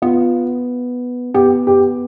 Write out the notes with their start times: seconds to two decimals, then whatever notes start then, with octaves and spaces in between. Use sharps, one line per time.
0.02 B3 F4
1.34 B3 G4
1.67 G4